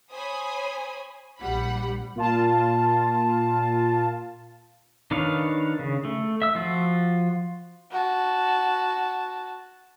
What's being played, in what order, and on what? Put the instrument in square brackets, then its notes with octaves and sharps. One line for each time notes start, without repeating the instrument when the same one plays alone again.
[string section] C5 C#5 G#5 B5 D#6
A#1 G3 F#5 B5
[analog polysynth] A#2 F4 A5
[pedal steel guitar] D#3 D4 B4 C#5 F5
C#3
A3
E5 E6
F3 F4 F#4
[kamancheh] F#4 A5